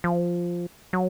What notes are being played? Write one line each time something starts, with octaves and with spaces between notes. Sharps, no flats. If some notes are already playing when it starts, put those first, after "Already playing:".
F3
F#3